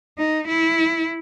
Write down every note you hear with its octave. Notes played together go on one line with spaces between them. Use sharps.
D#4
E4